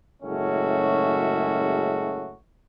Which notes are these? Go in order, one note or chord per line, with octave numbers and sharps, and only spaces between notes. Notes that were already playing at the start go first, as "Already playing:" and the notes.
F#1 A2 G#3 C#4 F#4 E5